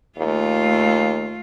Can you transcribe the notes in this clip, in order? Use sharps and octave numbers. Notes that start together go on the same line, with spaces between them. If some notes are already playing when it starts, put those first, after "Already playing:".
D#2 A3 F4